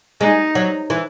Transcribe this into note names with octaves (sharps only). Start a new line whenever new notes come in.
G#3 D#4
F#3
E3